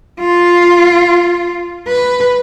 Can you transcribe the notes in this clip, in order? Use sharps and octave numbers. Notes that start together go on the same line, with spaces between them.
F4
B4